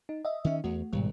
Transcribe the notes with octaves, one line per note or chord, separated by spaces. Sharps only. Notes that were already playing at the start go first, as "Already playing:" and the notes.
D#4
D#5 E5
D#3 C#4
E2 A3 F#4
G#1 G#2 B2 G3